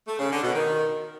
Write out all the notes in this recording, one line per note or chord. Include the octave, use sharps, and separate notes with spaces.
A3
C#3
D3
B2
D#3